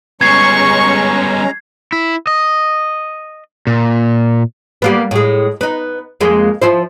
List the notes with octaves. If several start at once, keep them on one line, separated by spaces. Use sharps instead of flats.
G3 G#3 B3 C#4 A#5 C#6 G#6 C7
E4
D#5
A#2
G3 A#3 B3
A2 G#3
B3 D#4
F2 G#3 A#3
F3 E4 C5